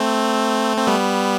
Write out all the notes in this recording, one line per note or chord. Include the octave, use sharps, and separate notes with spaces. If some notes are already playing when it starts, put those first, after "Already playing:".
Already playing: A3 C4
C4
G3 B3